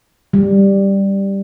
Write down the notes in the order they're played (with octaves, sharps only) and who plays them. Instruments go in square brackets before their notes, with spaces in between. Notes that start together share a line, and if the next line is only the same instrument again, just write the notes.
[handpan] G3